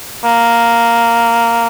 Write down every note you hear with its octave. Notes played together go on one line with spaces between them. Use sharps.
A#3